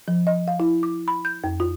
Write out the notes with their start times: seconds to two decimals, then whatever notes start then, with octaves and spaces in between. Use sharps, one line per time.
0.08 F3
0.27 D#5
0.48 F5
0.60 E4
0.83 D6
1.08 B5
1.25 G6
1.44 F2
1.60 F4